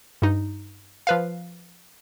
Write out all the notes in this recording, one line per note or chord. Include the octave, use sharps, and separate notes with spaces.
G2 D#4
F3 B4 F5